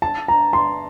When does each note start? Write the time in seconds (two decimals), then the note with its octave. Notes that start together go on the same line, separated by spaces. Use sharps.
0.02 A5
0.28 A#5
0.53 C6